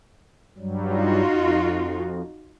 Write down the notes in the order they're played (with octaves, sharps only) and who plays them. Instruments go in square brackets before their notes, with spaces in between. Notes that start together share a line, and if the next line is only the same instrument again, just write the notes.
[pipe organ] G2 F#3 G3
[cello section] D#4 F4 F#4
[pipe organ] F2